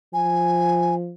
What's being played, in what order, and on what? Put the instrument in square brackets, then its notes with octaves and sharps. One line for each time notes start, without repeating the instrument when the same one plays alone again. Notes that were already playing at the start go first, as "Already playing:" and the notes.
[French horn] F3 [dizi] G#5